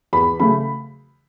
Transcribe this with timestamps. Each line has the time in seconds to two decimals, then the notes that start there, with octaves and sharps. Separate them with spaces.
0.13 E2 B5
0.40 C#3 F#3 A3 B5